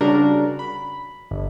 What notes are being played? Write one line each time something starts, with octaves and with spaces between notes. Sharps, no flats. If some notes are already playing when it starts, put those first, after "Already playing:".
C#3 G3 D4 F#4 A#4
B5
G1